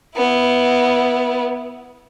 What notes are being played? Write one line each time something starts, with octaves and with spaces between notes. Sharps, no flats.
B3 E4